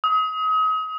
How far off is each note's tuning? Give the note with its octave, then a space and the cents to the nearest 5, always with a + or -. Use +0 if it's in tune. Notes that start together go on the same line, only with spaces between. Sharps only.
D#6 +35